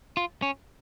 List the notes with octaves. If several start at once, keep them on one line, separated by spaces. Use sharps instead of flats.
F4
C#4